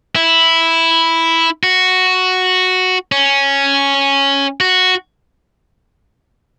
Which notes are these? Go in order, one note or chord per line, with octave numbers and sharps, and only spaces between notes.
E4
F#4
C#4
F#4